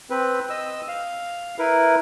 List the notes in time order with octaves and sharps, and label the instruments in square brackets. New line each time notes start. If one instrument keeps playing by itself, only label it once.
[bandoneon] C4 B4
D#5 E6
F5
E4 A#4 B4